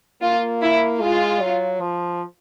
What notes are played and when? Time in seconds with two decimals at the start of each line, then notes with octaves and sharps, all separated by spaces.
0.22 A#3 F4
0.62 E4
1.01 G#3 F4
1.41 F#3
1.81 F3